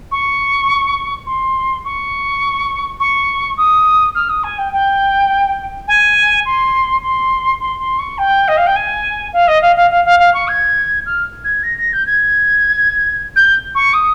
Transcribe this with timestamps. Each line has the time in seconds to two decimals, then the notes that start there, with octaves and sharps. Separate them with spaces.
0.11 C#6
1.26 C6
1.85 C#6
3.00 C#6
3.57 D#6
4.15 F6
4.29 D#6
4.43 G#5
4.58 G5
4.73 G5
5.88 G#5
6.45 C6
7.03 C6
7.60 C6
7.79 C6
7.99 C#6
8.18 G5
8.48 D#5
8.57 F5
8.66 G5
8.76 G#5
9.33 F5
9.48 D#5
9.62 F5
9.76 F5
9.91 F5
10.05 F5
10.19 F5
10.34 C#6
10.48 G#6
11.06 F6
11.44 G#6
11.63 A#6
11.78 A#6
11.93 G6
12.06 G#6
13.36 G6
13.75 C#6
13.93 D#6